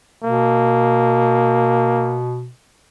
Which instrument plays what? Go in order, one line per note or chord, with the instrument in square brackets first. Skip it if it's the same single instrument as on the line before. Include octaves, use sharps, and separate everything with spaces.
[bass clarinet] B2 [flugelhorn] A#3